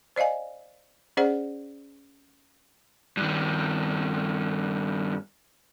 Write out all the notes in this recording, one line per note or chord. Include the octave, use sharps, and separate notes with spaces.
C5 D5 D#5 F5 G#5
C#4 G#4 C5 D5 F#5
G2 D#3